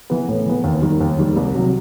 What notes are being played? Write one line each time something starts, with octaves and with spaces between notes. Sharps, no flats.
E3 B3
A2
E3 B3
D#2
D#3 G3
D#2
D#3 G3
C2
C3 F#3